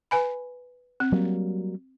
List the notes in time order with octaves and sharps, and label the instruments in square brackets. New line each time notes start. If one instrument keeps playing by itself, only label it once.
[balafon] B4 G#5 B5
C4
[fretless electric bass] F#3 G3 A#3